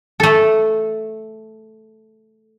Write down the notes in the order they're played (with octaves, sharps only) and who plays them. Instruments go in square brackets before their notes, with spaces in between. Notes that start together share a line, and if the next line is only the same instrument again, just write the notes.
[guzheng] A3 A4